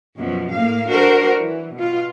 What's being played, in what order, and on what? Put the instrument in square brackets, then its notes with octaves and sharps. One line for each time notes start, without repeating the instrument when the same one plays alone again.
[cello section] F#2 B2 F3
A2 A#3 F5
D4 F#4 A4 A#4 C5
E3
B2 F4